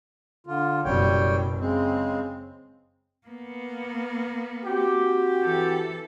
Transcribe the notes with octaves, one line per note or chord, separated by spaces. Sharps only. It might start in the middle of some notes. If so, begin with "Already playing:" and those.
D3 F4
F#1 B2 G3 C#5 G5
C#3 G#3 C4
A#3 B3
C4 F#4 G4
E3 A4